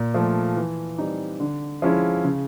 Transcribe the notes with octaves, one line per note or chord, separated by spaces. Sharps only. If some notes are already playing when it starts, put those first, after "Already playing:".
Already playing: A#2
F3 A3
E3
G3 C4 D#4
D3
F3 G#3 C#4 E4
C#3